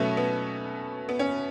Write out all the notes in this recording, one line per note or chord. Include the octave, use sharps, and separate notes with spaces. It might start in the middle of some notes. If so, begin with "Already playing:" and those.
Already playing: B2 F#3 A3 B3 C#4
B3
B3
C#4